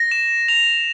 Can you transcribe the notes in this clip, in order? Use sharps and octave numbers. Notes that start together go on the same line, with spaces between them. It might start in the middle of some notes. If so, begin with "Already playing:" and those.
Already playing: A#6
E7
F7